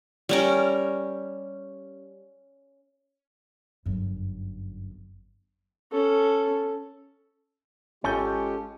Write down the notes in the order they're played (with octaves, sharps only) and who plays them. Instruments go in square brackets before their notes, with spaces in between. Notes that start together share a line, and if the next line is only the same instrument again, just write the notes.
[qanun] G3 C#4 A#4
[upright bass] G1 F#2
[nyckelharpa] C#4 A4
[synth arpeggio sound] G#1 A5 G6 [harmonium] G#3 F4 G4 [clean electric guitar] C#4 A4